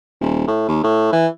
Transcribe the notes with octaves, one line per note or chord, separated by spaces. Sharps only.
D#1
A2
D#2
A2
E3